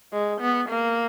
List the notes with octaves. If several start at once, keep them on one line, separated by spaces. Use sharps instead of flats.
G#3
B3
A#3